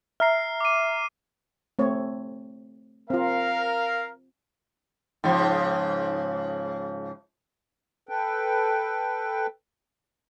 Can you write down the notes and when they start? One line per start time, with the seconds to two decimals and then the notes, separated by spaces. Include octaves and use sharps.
0.20 E5 A#5 F6 C7
0.61 D6 D#7
1.79 A3 C4 C#5
3.10 C4 F4 A#4 F5
5.24 G#2 C#3 F3
8.09 A4 B4 G5